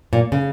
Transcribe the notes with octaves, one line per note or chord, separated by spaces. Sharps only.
A#2
C#3